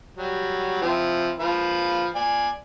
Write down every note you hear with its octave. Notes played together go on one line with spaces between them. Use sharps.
F#3 G3
F3 C4 E4
F3 B4 F5
D5 G#5